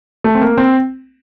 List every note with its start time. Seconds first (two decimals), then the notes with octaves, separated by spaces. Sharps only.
0.24 A3
0.35 C4
0.41 A#3
0.58 C4